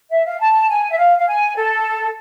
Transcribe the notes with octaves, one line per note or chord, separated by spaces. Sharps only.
E5
F5
A5
G#5
E5
F5
F5
G#5
A4